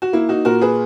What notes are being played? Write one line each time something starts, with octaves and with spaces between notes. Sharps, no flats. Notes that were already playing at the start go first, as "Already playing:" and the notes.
F#4
A#3 E4
D#4 F#4
A#2 F#4 A#4
G#4 B4